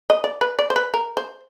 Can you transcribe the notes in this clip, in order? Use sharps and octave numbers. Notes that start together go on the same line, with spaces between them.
D#5
D5
B4
D5
C5
B4
A#4
C5